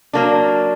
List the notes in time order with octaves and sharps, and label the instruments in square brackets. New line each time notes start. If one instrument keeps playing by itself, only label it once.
[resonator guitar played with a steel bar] F#3 A#3 D4